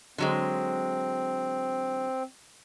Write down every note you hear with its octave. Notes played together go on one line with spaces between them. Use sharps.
D3 F#3 G#3 C4